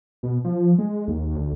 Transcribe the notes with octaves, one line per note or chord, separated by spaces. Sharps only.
B2
F3
G#3
D#2
D2